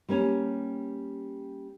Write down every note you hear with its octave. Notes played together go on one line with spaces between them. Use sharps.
G3 A#3 C#4